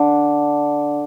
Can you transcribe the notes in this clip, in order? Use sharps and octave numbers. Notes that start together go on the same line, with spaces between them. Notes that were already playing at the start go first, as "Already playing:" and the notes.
Already playing: D3